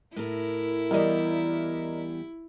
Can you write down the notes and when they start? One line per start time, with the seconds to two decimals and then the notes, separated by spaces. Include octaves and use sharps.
0.16 A2 E4 A#4
0.91 E2 G3 A#4 D5 D#5